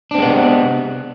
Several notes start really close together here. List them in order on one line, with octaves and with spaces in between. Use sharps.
D4 C4 G#3 B3 C3